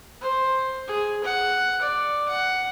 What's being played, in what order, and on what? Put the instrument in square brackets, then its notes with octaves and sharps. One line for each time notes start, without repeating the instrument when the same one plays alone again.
[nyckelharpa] C5
G#4
F#5
D5
F#5